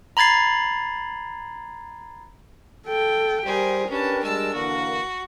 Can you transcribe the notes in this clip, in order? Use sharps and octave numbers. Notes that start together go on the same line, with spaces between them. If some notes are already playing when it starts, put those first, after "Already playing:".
A#5 B5 G#6 A6 C7
A4 G5
G3 G4 G#4 A#4 C5
C#4 D4 G4 A#4 B4 A5
G3 G#3 A5 E6
D3 E3 A#3 F#4